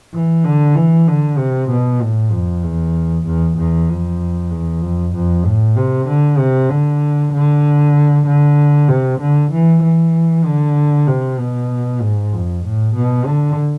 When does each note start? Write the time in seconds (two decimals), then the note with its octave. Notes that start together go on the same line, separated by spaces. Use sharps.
0.14 E3
0.45 D3
0.76 E3
1.08 D3
1.38 C3
1.70 B2
2.01 A2
2.32 F2
2.64 E2
3.26 E2
3.58 E2
3.89 F2
4.51 E2
4.82 F2
5.14 F2
5.46 A2
5.76 C3
6.08 D3
6.39 C3
6.70 D3
7.33 D3
8.27 D3
8.89 C3
9.21 D3
9.52 E3
9.83 E3
10.45 D3
11.08 C3
11.39 B2
12.02 G#2
12.33 F2
12.64 A2
12.96 B2
13.27 D3